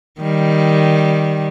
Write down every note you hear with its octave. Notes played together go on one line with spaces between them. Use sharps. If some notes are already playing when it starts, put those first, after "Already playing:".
D#3 G3